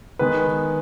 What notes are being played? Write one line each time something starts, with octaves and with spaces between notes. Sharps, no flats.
D#3 G#3 B3 B4